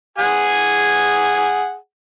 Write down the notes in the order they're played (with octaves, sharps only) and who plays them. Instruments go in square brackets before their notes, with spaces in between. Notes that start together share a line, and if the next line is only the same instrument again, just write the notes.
[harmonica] G#4 F#5 G#5